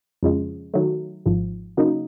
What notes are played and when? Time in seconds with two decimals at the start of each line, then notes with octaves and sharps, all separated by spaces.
0.23 F2 C#3 F3 G#3
0.74 D#3 F#3 A3
1.26 G#1 G#2 F3
1.77 C#3 F#3 A#3 D#4